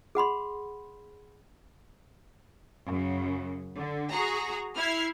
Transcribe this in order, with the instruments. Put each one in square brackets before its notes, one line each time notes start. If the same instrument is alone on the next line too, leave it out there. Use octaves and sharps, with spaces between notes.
[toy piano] G#4 F#5 B5 C6
[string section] F#2 C#3
D3
F#4 G#4 A#5
E4 F6 G#6 C7